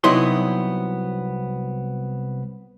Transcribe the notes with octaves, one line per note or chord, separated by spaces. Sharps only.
C2 F#3 B3 D#4 E4 C6